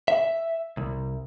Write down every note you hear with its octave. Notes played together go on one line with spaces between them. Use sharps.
E5
C2